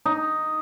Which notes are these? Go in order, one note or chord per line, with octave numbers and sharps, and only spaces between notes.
D#4